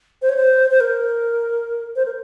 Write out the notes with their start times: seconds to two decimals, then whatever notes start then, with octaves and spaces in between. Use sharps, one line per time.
0.22 C5
0.29 C#5
0.37 C5
0.71 C5
0.80 A#4
1.96 C5
2.05 A#4